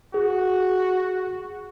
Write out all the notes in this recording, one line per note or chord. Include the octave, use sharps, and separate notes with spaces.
F#4 G#4